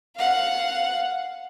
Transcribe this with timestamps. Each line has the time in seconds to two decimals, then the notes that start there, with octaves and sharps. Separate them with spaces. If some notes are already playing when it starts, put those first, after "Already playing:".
0.15 F5 F#5